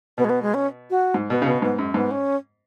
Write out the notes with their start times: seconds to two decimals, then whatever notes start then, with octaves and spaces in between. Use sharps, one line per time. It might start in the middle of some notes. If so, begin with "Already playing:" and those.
0.18 B2 B3
0.24 G#3
0.29 B3
0.42 G#3
0.54 C#4
0.90 F#4
1.14 G#2
1.30 B2 B3
1.42 C#3
1.46 B2 B3
1.62 G#2 B3
1.78 F#2 G#3
1.94 G#2 B3
2.11 C#4